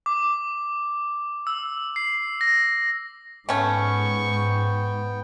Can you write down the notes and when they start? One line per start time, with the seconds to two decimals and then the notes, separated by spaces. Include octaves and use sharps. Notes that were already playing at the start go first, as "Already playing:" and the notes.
0.06 D6
1.47 E6
1.96 C7
2.41 A#6
3.49 G#2 A3 B3 C#4 G5 C#6